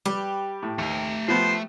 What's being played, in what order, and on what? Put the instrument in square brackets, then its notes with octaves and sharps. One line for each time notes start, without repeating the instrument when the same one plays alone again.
[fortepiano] G3 [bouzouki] G4 B4
[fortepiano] A2
[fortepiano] D#2 [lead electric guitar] A3 A#5
[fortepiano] F3 B3 [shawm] C5